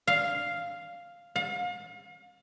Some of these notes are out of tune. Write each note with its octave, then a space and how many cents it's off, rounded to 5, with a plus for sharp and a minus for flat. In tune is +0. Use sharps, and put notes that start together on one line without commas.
F5 +0
F5 +40